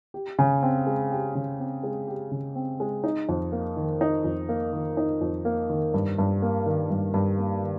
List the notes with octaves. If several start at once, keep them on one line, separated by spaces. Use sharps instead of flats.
G4
C#3
C4
G#3
G4
C#3
C4
G#3
G4
C#3
C4
G#3
D#4
F2
A#3
D#3
D#4
F2
A#3
D#3
D#4
F2
A#3
D#3
G2
G2
A#3
D#3
G2
G2
A#3
D#3